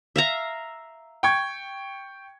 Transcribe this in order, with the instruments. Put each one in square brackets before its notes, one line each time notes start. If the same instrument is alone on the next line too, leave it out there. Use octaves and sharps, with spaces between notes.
[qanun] E5 F5 A#5
[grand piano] G5 C#6 G#6